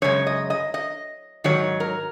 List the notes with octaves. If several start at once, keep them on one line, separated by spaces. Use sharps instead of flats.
F#2 C#3 G#3 C#5
D#5
D#5
D#5
G#2 D#3 F#3 C#5
A#4